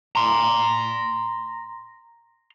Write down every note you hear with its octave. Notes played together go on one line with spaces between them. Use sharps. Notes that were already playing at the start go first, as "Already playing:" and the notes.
A#5 C6